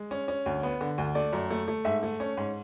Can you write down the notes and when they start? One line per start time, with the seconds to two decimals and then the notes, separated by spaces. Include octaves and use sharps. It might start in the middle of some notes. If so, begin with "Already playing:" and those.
Already playing: G#3
0.11 C#4
0.28 C#4
0.46 D2
0.63 B3
0.81 D3
0.98 D2
1.15 A3 D5
1.33 F#2
1.50 A3
1.68 A3
1.85 G#2 E5
2.03 A3
2.20 C#4
2.37 G#2